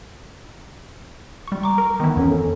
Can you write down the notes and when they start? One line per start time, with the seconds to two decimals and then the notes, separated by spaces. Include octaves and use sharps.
1.48 G3 C#6
1.63 A#5 C#6 D6
1.78 A#4
2.00 D#3 E3 B3
2.16 F2 C#4
2.29 A4